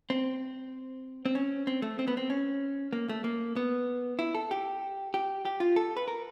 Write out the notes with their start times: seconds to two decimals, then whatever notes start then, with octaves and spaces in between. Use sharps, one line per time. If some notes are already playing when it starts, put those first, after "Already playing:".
0.10 C4
1.26 C4
1.35 C#4
1.67 C4
1.82 A3
1.99 C4
2.08 B3
2.17 C4
2.30 C#4
2.93 A#3
3.09 A3
3.24 A#3
3.56 B3
4.19 E4
4.35 A4
4.51 G4
5.14 G4
5.45 G4
5.60 F4
5.76 A4
5.97 B4
6.08 A#4